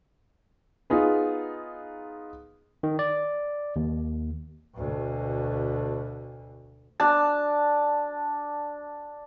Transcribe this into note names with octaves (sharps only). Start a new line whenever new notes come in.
B3 D#4 F4 G#4 B4
D#3
D5
D#2
D2 B2
D4 A5